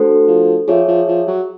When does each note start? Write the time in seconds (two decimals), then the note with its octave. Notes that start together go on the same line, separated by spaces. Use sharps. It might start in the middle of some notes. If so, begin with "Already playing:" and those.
Already playing: A3 D4 F#4 A4 C5
0.27 F3
0.68 F3 G#4 C#5 E5
0.88 F3
1.08 F3
1.27 F#3